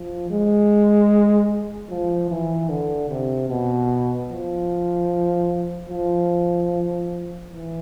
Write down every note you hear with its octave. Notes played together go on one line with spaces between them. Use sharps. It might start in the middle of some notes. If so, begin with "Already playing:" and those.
Already playing: F3
G#3
F3
E3
D3
C3
B2
F3
F3
E3